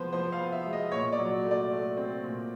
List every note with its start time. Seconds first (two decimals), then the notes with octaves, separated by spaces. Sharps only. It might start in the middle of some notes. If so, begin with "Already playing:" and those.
Already playing: F3 G#3 B3 B4 C5
0.12 F3 C5
0.32 F5
0.39 B3
0.52 E5
0.66 G#3
0.73 D#5
0.92 A#2 C#5
1.12 D5
1.19 F#3
1.45 A3
1.51 D5
1.72 A3
1.97 C4
2.23 A#2